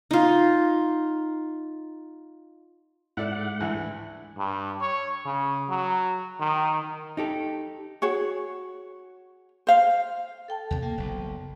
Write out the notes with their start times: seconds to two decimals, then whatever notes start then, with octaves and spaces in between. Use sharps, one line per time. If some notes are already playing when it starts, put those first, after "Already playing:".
0.11 D#4 F4
3.17 G#2 E4 A4 D5 F#5
3.60 D2 E3 E4
4.38 G2
4.81 C#5
5.26 C#3
5.69 F#3
6.40 D#3
7.17 D#4 G4 A4
8.02 F#4 G#4 C#5
9.67 C5 F5
10.48 A4 G5 A5
10.71 D#2 C3
10.82 A#3
10.97 F#1 B1